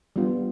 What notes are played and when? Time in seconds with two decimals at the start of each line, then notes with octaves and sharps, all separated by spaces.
0.16 G3 B3 D4 F4